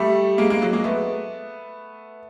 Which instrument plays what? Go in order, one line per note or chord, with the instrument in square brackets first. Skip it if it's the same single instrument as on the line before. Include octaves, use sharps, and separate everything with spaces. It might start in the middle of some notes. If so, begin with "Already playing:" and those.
Already playing: [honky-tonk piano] G3 A3
G#3 A#3
G#3 A#3
F#3 G#3
G#3 A#3
A3 B3